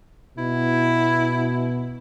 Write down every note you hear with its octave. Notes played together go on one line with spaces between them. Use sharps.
B2 E4